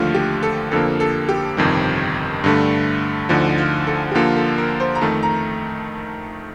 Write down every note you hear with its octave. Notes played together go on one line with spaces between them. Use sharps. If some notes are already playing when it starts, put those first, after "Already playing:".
Already playing: D#2 D3 F3 A3 F4
G4
A4
F2 D3 F3 A#3 A4
A4
G4
G1 F2 C3 D#3 G3
G2 D3 A3
D2 D3 F3 D#4
F4
A4
G4
D3 F3 A#3 F4 A4
A4
A#4
C5
A#5
F2 D#3 A3 A5
A#5